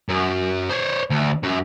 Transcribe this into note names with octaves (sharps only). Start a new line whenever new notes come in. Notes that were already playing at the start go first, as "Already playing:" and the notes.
F#2
C5 C#5
D2
F#2